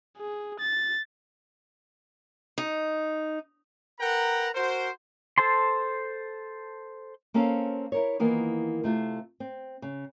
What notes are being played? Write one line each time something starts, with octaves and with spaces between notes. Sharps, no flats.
G#4
A6
D#4
A#4 B4 F#5 G5 A#5
F#4 A#4 C5
A4 C5 A5 C6
A#3 C4 C#4 A4 C#5 F5
E4 A#4 C#5
D#3 E3 A#3 B3 F4
C3 A3 F4
C4
C#3